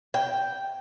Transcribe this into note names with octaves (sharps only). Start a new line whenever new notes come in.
G5